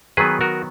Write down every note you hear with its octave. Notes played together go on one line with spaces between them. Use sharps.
D#3 F#3 B3 G#4 B4
F#4 A#4